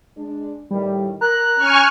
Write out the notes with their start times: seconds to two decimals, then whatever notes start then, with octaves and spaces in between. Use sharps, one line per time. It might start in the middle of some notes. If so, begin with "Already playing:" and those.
0.16 G#3 D4
0.70 A2 D#3 G3
1.21 A#4 A#5 F#6
1.57 C#4 G#5 C#6 F6